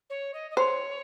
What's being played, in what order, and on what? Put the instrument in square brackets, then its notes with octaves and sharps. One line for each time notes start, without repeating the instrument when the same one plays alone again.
[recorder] C#5
D#5
D#5
[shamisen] C5 [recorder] C#5